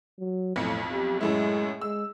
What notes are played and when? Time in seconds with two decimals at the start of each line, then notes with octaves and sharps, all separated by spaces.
0.19 F#3
0.56 B1 F2 A2 C#7
0.92 G4
1.21 F#2 A2 G#3 E4
1.82 G#3 E6